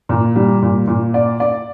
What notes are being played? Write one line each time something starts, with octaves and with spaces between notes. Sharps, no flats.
A#2
G3
A#2
A#2
D5
D5